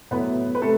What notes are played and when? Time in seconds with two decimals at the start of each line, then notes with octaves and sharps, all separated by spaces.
0.11 A2 F#3 B3 E4 B4
0.55 B4
0.62 C3 A3 A4